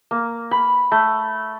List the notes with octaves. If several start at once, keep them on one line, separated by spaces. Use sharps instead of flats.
A#3
B5
A3